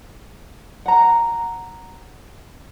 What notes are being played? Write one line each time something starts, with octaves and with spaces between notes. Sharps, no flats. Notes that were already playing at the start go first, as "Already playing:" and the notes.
F#5 A#5